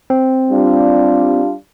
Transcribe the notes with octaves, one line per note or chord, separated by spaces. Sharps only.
C4
G3 D4 F4